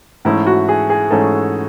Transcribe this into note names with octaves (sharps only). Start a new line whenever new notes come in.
G#2 E3 A3 C#4 E4
F#4
G#4
G#4
G#2 E3 A3 C#4 A4